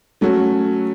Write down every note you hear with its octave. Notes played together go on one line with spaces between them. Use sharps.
F#3 A3 C#4 F#4